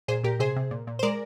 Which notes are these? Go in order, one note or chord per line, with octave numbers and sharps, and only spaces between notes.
A#2 G#4 C5
A#2 G4 A#4
C3 G#4 C5
C3
A#2
A#2
C5
G#3 A#4 D5